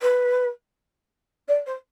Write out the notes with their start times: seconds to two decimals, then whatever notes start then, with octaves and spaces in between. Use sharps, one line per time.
0.01 B4
1.48 D5
1.66 C5